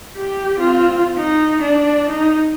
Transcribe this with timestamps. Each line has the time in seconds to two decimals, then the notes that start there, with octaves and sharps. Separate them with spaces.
0.16 G4
0.58 C4 F4
1.17 D#4
1.62 D4
2.09 D#4